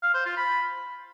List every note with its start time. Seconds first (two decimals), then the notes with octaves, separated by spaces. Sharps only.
0.03 F5
0.14 C5
0.26 F4
0.37 B5